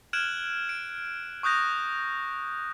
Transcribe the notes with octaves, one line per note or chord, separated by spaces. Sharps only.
F6 F#6 G#6 D7 E7 F#7
D7
C#6 D#6 F#6 G6 A#6